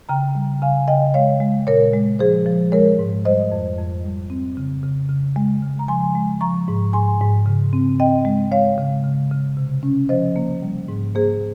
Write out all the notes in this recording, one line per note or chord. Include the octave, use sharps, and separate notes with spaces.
C#3 G5 A#5
G3
C#3 F5 G#5
C#3 D#5 G5
G#3 C#5 F5
G#3
A#2 A#4 C#5
G#3
F3 G#4 C5
F3
G#3 A#4 C#5
G#2
G3 C5 D#5
F2
F2
G3
C4
C#3
C#3
C#3
G#3
C#3
A#5
F3 G#5 C6
G#3
F3 A#5 C#6
G#2
G#2 G#5 C6
G#2
C#3
C4
C4 D#5 G5
G#3
G#3 C#5 F5
C#3
C#3
C#3
C3
C#4
F3 C5 D#5
A#3
G3
G#2
A#3 G#4 C5